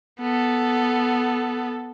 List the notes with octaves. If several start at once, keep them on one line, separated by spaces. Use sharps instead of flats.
B3 A4